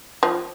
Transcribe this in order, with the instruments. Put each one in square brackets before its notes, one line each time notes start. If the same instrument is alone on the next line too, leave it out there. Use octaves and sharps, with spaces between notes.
[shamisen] F3